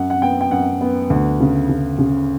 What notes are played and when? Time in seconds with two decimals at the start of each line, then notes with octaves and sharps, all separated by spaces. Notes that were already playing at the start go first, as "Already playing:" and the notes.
Already playing: F#2 F#5
0.10 F#5
0.22 B3 G5
0.41 G5
0.51 F#2 F#5
0.81 B3
1.10 D2
1.40 C#3
1.69 C#3
1.98 C#3